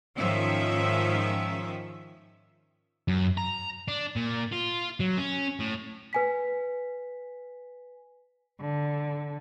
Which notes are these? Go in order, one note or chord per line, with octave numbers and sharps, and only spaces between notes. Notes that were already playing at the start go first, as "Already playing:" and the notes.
G#2 D#3 F3 C#4 E5
F#2
A#5
D4
A#2
F4
F#3
C#4
A2
B4 G#5 B6
D3